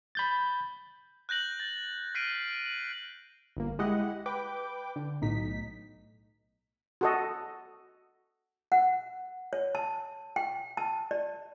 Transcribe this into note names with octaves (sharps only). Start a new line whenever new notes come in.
B5 G6 A6
F#6 G6 A#6 F#7
A6
F6 B6 C7 D7 D#7
F#7
G1 A#3
G#3 E4 G4 D#5 F#5
B4 G5 D6
D3
B1 A2 D#4 B6
F#4 A4 D#5
F#5
C#5
A5
G5
A5
D5